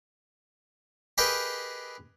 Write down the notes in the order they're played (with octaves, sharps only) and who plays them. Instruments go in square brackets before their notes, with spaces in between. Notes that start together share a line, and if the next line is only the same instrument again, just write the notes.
[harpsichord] G4 G#4 A#4 B4 D#5 G5